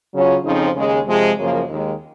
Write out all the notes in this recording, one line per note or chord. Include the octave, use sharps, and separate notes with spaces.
C#3 F#3 C#4 F4
F2 C#3 F3 C4 D#4
D#2 C#3 G#3
C3 F3 G#3
F#2 C#3 F3 A#3
D#2 D#3 G#3